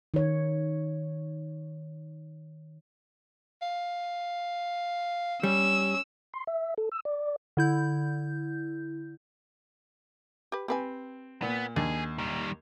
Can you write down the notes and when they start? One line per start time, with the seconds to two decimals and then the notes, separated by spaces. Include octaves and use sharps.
0.14 D#3 C#5
3.62 F5
5.43 G3 C#4 E6
6.34 C6
6.47 E5
6.78 A4
6.92 E6
7.05 D5
7.57 D3 E4 G6
10.52 G4 B4
10.68 C4 G4 B4 G#5
11.42 A#2 B3
11.76 D#2 D4 G#4
12.18 D#3 G3